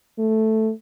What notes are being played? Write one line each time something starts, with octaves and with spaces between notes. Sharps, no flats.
A3